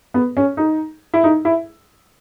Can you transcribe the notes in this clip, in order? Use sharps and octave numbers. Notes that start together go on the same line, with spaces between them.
B3
C#4
D#4
E4
D#4
E4